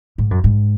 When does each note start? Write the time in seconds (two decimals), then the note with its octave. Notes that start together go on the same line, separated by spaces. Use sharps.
0.18 G#2
0.31 F#2
0.44 G#2